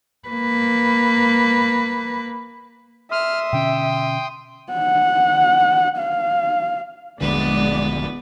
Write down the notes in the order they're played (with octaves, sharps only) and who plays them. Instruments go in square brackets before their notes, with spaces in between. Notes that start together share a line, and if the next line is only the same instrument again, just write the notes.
[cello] A#3 B4
[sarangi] E5 [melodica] C6 D#6 [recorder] F6
[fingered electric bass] B2 D3 C#4 [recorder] G5
[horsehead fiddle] F#5
F5
[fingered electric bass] D#1 A#1 D3 [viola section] G#3 D5 [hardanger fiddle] B3 B4